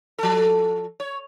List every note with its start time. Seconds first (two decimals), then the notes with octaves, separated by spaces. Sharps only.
0.19 F3 A4
1.00 C#5